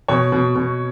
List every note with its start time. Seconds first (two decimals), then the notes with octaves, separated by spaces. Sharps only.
0.08 B2 C#5
0.32 B2
0.55 B2